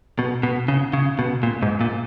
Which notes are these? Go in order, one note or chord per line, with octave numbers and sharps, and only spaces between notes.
B2
B2
C#3
C#3
B2
A#2
G#2
A#2